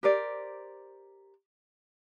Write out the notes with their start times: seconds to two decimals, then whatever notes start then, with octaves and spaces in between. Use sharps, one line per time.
0.03 G4 A#4 C5 D5